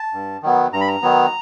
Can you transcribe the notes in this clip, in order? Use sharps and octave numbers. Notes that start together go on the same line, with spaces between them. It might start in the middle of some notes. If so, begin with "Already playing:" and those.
Already playing: A5
G2
D#3 F#3 B3
G2 A#5
B5
A#5
D#3 F#3 B3